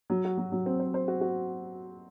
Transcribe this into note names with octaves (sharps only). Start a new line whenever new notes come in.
F#3
F#4
F#3
F#3
C4
C5
C5
F#4
F#4